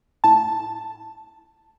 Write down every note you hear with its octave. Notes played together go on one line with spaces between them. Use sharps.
A2 A5